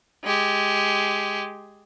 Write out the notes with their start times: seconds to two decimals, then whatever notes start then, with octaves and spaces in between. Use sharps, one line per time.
0.24 G#3 G4